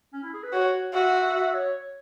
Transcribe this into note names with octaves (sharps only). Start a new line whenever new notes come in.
C#4
E4
G#4
B4
F#4 C#5
F#4 E5
E5
E5
E5
C#5